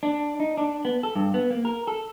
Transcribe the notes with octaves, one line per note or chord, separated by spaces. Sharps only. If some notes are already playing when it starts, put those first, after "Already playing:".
D4
D#4
D4
B3
A4
G2
B3
A#3
A#4
A4